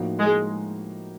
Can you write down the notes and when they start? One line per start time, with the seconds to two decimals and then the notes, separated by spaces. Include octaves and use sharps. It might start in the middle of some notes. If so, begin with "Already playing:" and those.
Already playing: A2 F3 A#3 D#4 F#4
0.19 G#3